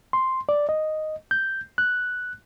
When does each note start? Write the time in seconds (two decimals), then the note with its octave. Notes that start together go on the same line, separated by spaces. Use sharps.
0.13 C6
0.49 D5
0.69 D#5
1.31 G6
1.78 F#6